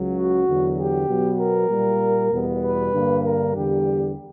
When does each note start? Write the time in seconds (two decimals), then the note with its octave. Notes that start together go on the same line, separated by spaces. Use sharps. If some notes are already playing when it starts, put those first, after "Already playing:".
Already playing: C#2 C#3 F#3
0.16 F#4
0.47 E2 D3 F#3
0.78 G4
1.09 B2 F#3 B3
1.39 A#4
1.70 A#2 G3 A#3
2.32 E2 B2 G3 B3
2.63 B4
2.94 G2 D3 A#3
3.24 A#4
3.55 E2 D3 G3 G4